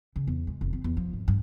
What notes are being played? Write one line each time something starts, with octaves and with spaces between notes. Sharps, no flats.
C#3
E2
G#3
F1
C4
E2
F3
G#2
G2